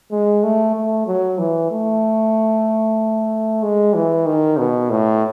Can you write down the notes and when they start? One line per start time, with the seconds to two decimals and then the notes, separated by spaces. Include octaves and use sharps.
0.12 G#3
0.44 A3
0.75 A3
1.07 F#3
1.39 E3
1.71 A3
3.63 G#3
3.94 E3
4.26 D#3
4.58 B2
4.90 A2